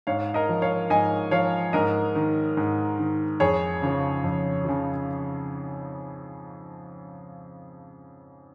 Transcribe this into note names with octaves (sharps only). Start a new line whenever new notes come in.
G#2 C#5 F5
A#4 D#5
F3
C#5 F5
G#2 D#5 G#5
F3 C#5 F5
G#2 A#4 D#5
D#3
G#2
D#3
F2 G#4 C#5
C#3 F3
F2
C#3 F3